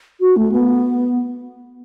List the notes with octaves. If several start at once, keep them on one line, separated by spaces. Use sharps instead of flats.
F#4
A3
B3